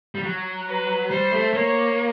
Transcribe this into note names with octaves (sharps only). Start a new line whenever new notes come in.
G3
F#3
B4
G3 C5
A3
A#3 C#5